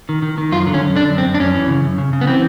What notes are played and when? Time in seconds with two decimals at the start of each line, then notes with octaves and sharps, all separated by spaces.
0.09 D#3
0.22 D#3
0.38 D#3
0.52 F#2 F4
0.67 D3
0.74 C#4
0.81 F#2
0.96 D3 D4
1.10 F#2
1.18 C4
1.25 F#2
1.34 D4
1.40 F#2 C#4
1.55 E3
1.69 C#3
1.83 F#2
1.98 C#3
2.13 C#3
2.21 B3
2.27 E3 C4